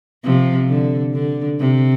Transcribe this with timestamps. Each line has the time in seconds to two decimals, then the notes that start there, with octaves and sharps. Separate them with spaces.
0.25 C3 F3
0.69 D3
1.14 D3
1.60 C3